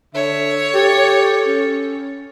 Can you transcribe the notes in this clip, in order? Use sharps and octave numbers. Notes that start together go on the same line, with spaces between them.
D3 C#5 E5
G4 A4
C#4